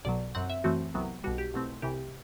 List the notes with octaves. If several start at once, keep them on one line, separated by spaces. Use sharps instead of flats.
B1 B2 F#3 D5
F#2 F#3 C4 F#5
E5
F#2 E3 A3 C4 F#4
C2 C3 F#3 B3
B1 B2 G3 F#4
G4
C2 B2 A3 C4
C2 C3 E3 G4